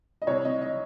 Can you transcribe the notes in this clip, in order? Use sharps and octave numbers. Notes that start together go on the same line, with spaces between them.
D#5
C2 C#5
C3 D#5
D#5